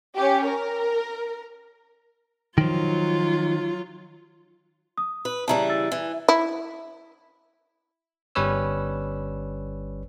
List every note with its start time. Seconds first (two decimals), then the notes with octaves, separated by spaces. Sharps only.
0.16 C#4 G4
0.46 A#4
2.58 D#3 F3 F#3 F4
4.98 D#6
5.25 B4
5.48 C#3 E3 G3 A5 A#5
5.69 E6 A6
5.92 E3
6.29 E4
8.35 G1 G3 C#4 B4 C#5 E6